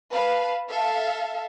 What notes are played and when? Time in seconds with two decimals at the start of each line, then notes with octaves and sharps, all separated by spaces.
0.11 B4 F5 A5
0.69 A4 E5 F5 A5